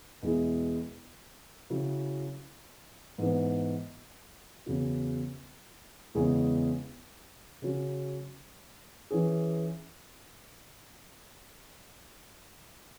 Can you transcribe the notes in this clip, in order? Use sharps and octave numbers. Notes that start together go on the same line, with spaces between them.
E2 B2 G#3 E4 G#4
C#3 F#3 E4 G#4
G#2 E3 B3
E2 C#3 F#3
E2 C#3 G#3 E4 G#4
C#3 F#3 C#4 F#4
E3 C#4 G#4